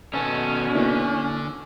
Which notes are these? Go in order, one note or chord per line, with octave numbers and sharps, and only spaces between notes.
B2 D#3 C#4 A4
D3 A#3 D4 E4